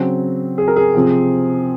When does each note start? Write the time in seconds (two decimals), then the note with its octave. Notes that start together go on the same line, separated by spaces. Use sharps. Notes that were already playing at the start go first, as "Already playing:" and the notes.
Already playing: C#3 F#3 C4
0.58 G#4
0.68 A#4
0.76 G#4
0.94 C3 F3 C4